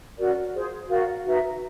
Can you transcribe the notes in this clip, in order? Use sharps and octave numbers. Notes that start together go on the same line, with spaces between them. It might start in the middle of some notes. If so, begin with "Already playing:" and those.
C#4 F#4 A#4 D5
F4 G#4 C5
F#4 A#4 D5 F5
D#4 F#4 B4 E5